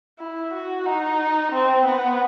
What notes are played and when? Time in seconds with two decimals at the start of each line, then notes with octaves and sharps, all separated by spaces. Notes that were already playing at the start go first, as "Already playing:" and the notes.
0.19 E4
0.53 F#4
0.86 D#4
1.52 C4
1.85 B3